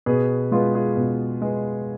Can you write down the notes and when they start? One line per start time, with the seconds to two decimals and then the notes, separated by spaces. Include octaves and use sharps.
0.06 B2 G#4 B4
0.51 G#3 B3 F4 G#4
0.75 F4 G#4
0.97 B2
1.41 G#3 B3